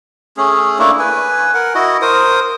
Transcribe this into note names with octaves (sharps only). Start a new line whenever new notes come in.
A3 C#4 G#4
A3 A#3 D4 E4
B4 G#5
A#4 F#5
E4 F#4 D#5
A#4 C5 D#6